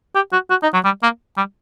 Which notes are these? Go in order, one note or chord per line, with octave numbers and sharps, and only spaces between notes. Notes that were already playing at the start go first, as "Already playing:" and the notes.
G4
F#4
F#4
D#4
F#3
G3
A#3
G3